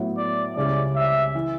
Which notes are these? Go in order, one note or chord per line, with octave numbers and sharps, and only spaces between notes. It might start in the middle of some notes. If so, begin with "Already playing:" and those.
Already playing: A2 F#3 B3 E4
D5
C#2 C#3 G3 C#4 E4 D5
E5
E3